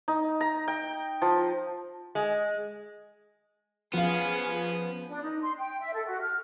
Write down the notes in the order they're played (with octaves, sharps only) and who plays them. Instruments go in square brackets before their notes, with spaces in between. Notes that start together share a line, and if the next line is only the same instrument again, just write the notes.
[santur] D#4
A#5
G5
F3
[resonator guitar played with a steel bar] G#3
[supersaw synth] F3 [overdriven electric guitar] B3 [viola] C#4 G#4 [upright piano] F4 F5
[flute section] D4
D#4
C6
G5
E5
A4
F#4
F6